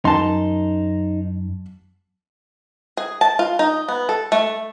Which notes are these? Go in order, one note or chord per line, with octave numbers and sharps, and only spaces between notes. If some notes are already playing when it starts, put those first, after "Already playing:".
F#2 D#4 A5 C6
G#4
A5
F4
D#4
B3
A4
A3